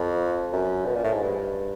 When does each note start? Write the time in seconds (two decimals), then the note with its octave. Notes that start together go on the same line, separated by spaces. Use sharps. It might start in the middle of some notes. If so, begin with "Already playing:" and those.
Already playing: F2
0.53 F#2
0.86 B2
0.95 A#2
1.04 A2
1.13 G#2
1.22 G2